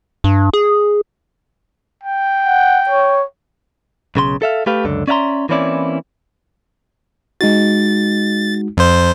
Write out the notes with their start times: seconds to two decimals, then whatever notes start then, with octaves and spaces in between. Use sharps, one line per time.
0.24 G2
0.53 G#4
2.04 G5
2.47 F#5
2.90 C#5
4.16 B1 C#3 B4 C6
4.42 A4 E5 F5
4.66 A3 G4 B4 F5
4.85 C#2 F#2 D3
5.08 C#4 D5 E5 F5 A#5 C6
5.49 E3 A#3 C4 C#4 E4 D5
7.41 G#3 D#4 F#4 A6
8.77 F2 C5